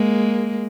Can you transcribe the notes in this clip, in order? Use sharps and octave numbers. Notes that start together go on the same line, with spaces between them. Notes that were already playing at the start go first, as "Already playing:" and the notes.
Already playing: G#3 A#3